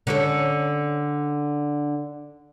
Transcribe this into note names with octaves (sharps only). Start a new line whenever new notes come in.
D3 C#4 A4